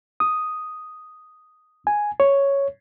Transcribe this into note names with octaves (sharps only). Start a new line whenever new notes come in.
D#6
G#5
C#5